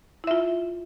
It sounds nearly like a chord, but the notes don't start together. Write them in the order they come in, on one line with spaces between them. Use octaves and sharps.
E4 E5 F4